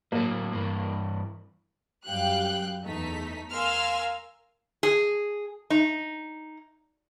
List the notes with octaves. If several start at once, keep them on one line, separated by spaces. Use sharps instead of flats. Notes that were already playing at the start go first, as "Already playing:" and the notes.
A2 F#3 A#3
G2 E3
F#2 G3 F5 G5 F#6
E2 A3 D#4 B6
A#4 F5 G#5 C6 E6 F6
G#4
D#4